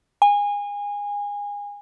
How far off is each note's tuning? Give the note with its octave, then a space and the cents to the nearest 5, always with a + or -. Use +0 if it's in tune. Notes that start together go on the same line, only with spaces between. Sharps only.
G#5 -25